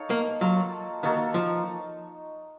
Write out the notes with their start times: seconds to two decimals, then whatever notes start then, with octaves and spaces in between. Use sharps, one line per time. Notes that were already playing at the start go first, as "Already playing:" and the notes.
Already playing: D#4 A4 C#5 F5
0.10 A#3
0.41 F#3 A#3 F4 A4
1.03 D#3 A#3 D#4 F#4 A4
1.34 F3